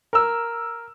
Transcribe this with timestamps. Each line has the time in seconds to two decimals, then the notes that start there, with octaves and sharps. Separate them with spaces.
0.13 A#4 E6